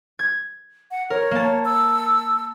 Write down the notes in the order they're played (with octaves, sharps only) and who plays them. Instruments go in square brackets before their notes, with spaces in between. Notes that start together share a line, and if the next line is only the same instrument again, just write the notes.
[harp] G#6
[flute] F#5
[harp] A#4 [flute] C#5
[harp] A#3 A5
[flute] E6